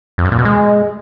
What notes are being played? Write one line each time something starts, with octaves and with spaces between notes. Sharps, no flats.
F2
F#2
A#2
B2
G#3